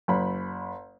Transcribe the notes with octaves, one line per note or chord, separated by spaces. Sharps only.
F#1 B5